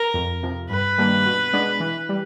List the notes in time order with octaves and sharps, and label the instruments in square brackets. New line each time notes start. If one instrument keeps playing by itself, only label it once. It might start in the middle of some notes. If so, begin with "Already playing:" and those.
Already playing: [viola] A#4
[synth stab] F2
C3 F3
[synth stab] G2 [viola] B4
[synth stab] D#3 G3 A#3 D4
B2
G#3 B3 D4
E3
G3